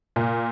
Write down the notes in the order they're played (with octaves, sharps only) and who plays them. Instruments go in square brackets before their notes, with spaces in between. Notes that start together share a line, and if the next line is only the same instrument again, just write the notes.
[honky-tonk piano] A#2